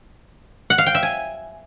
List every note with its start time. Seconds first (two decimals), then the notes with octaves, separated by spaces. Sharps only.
0.70 F#5
0.78 F5
0.86 G5
0.95 E5
1.03 G#5